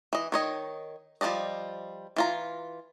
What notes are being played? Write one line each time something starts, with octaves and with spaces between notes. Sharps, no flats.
E3 D#5
D#3 C#5 D#5
F3 G3 B4 D5 D#5
E3 F4 A#5